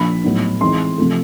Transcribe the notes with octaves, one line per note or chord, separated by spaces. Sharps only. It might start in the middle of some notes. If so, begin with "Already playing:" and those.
Already playing: A#2 F3 D4 B5
A2 F#3 B3 D#4
E3 G#3 C4 D#4 C6
C3 F3 A3